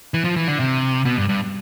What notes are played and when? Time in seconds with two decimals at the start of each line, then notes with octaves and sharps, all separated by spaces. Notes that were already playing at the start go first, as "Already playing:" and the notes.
0.14 E3
0.24 F3
0.36 E3
0.48 D3
0.60 C3
1.05 B2
1.18 G2
1.29 G2